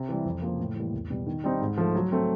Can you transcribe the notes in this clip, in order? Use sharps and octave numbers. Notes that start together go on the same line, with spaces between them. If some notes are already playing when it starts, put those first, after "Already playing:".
Already playing: C3
E3 G3
F2
C#3 F3 A#3
A2
E3 G3 A#3
E2
B2 G3
D#3
G3 C4 D#4
G#2
F3 A3
F#3
A3 C4